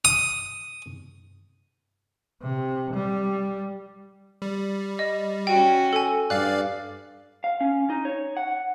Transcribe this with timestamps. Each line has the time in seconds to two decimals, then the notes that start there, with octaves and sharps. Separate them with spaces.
0.05 D#6
2.42 C3
2.94 G3
4.42 G3
4.99 D#5
5.47 C#4 F#4 G5
5.93 A4 G#5
6.30 G2 D5 F5 F#6
7.44 F5
7.61 C#4
7.90 D#4
8.05 C#5
8.37 F#5